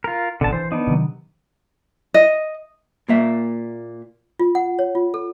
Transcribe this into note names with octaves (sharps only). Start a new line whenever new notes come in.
F4 A#4
G#1 B2 D3 A5
E3 C5
B3 D4 D#4
C3 D#3 F#3
D#5
A#2 A#3 E5
F4
F#5
C#5
F4
A4